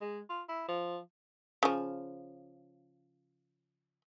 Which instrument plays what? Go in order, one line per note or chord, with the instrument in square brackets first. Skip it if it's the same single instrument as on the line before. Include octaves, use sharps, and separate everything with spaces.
[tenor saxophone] G#3
F4
E4
F3
[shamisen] C#3 F3